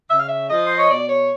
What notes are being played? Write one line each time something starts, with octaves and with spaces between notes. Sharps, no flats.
C#3 E5
F5
E5
F3 D#5
C5
C#5
B2 D5
C#5